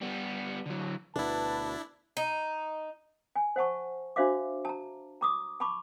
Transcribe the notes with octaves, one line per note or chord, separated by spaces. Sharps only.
G3 B3
D3 F#3
D2 B2 D4 E4 B4 A5
D#4
G#5
C5 F#5 A5 C#6
D4 F#4 C5 E5 F5 D6
A5 A#5
A#5 D6 D#6
A5 B5 C#6 D6